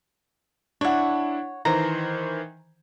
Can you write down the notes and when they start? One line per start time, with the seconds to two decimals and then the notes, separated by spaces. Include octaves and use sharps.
0.81 D4 E4 C#5 F#5
1.65 D#3 E3 C5 A#5